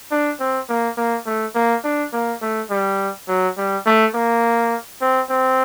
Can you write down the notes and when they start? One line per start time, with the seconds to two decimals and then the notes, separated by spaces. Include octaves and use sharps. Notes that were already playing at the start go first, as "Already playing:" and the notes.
0.11 D4
0.40 C4
0.69 A#3
0.97 A#3
1.26 A3
1.55 A#3
1.84 D4
2.13 A#3
2.42 A3
2.70 G3
3.28 F#3
3.57 G3
3.86 A3
4.15 A#3
5.01 C4
5.30 C4